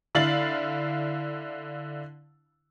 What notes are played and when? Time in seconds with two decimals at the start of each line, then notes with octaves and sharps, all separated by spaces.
0.15 D3 E4 F5 A6 F#7